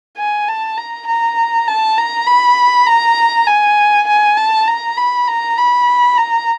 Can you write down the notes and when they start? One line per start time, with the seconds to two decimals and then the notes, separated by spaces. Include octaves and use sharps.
0.17 G#5
0.48 A5
0.78 A#5
1.08 A#5
1.67 A5
1.98 A#5
2.27 B5
2.87 A#5
3.47 G#5
4.07 G#5
4.37 A5
4.68 A#5
4.97 B5
5.28 A#5
5.58 B5
6.18 A#5